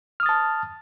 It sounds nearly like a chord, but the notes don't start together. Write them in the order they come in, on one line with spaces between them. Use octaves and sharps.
F6 D#6 A6 A5